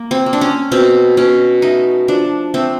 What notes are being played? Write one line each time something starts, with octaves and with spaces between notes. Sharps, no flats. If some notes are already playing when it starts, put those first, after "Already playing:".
Already playing: A#3
C4
A#3
D4
C#4
B2 C4
B2 C#4
A3 D#4
F3 D4
A3 C4